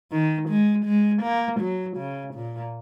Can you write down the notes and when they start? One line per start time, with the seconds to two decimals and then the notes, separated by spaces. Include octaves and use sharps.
0.12 D#3
0.49 G#3
0.85 G#3
1.22 A#3
1.60 F#3
1.97 C#3
2.34 A#2